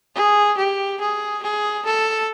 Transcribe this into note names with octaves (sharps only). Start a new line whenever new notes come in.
G#4
G4
G#4
G#4
A4